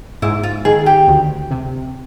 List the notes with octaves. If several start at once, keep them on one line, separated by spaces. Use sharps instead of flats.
G#2 E4
F4
D#3 G#4
G4
D2
C3